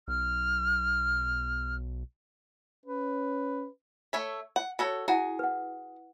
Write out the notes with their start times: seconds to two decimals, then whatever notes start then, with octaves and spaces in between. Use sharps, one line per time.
0.08 B1 F6
2.86 C#4 B4
4.13 A3 C#5 E5
4.56 F#5
4.79 F#4 A4 C#5
5.08 E4 F#4 G#4 F#5
5.39 B4 F#5